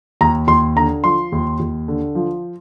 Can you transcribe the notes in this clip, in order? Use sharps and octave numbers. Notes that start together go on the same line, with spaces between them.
D#2 A#5
D#2 C6
D3 A#5
F3 C6
D#2
D#2
D3
F3